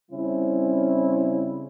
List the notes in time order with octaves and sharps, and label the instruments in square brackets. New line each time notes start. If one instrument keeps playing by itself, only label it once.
[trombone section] C#3 G3 C4 C#4 E4